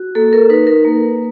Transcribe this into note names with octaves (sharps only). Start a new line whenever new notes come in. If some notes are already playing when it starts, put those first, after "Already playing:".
Already playing: F#4
A#3 A4
A#4
D#4 B4
A#4
A#3